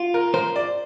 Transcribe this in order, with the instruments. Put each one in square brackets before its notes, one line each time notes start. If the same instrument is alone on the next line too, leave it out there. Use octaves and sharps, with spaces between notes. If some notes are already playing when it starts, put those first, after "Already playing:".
Already playing: [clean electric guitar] F4
[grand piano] A#4
[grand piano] A#4 [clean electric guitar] C5
[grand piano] D5